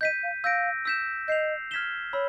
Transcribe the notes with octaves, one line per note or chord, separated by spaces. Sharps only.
D#5 G6 B6 D#7
F5
F5 E6 G6 A#6 D7
E6 G6 B6 E7
D#5 G6 C7 F7
F6 G#6 B6 E7 G7
C#5 B5 E6